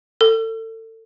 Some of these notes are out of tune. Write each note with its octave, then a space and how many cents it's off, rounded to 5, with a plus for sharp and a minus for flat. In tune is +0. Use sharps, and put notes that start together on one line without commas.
A4 +30